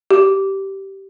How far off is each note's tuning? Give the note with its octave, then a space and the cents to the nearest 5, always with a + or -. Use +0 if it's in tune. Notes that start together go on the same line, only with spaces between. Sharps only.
G4 -15